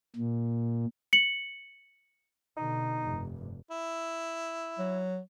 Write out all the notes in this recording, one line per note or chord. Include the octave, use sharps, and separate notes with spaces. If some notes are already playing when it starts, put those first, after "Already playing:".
A#2
C#7 F#7
B2 D3 D#4
F1 G2
E4
F#3